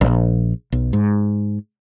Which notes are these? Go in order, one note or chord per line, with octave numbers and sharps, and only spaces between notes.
A#1
B1
G#2